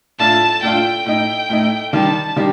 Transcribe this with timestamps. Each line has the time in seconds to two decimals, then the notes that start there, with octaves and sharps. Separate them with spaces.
0.19 A2 A3 D4 F4 A5
0.62 A2 A3 D4 F4 G5
1.06 A2 A3 D#4 G5
1.49 A2 A3 D#4
1.93 D#3 G3 D4 G4 A5
2.36 D#3 G3 D4 G4